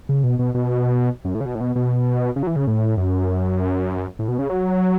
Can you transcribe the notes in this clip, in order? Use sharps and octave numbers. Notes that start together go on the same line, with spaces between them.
C#3
B2
B2
B2
F#2
A2
C#3
B2
A2
B2
B2
C#3
F#3
E3
C#3
A2
F#2
A2
B2
C#3
F#3